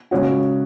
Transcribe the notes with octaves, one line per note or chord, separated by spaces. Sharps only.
C#3 G#3 C#4 F#4